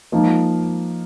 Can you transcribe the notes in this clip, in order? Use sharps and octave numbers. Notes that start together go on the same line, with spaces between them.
F3 A#3 D#4